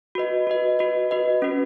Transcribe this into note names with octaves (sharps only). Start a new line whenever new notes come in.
F#4 B4 D#5
F#4 B4 D#5
F#4 B4 D#5
F#4 B4 D#5
C#4 F#4 B4